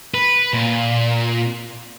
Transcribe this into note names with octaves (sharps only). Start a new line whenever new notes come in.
B4
A#2